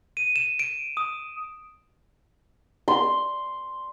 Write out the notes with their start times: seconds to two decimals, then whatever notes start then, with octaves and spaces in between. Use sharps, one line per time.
0.17 D#7
0.36 E7
0.59 D7
0.97 D#6
2.88 C6